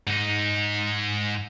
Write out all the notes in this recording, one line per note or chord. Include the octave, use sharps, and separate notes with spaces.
G#2 D#4